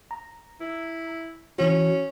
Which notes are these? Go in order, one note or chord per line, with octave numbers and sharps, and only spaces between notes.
A#5
E4
E3 C#4 F#4